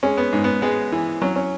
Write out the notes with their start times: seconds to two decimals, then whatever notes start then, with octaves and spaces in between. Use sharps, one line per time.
0.03 G#3 C#4
0.18 B3
0.33 G#2
0.44 B3
0.62 G#3 B3
0.92 E3
1.22 F#3 C#4
1.36 C#4